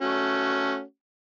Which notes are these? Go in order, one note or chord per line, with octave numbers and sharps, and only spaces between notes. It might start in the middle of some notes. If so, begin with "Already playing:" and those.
A3 C#4 F#4